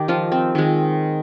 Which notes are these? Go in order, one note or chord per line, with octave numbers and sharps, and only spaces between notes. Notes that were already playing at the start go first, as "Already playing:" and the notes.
Already playing: D#3 G4
F3 F4
C4
D#3 G#3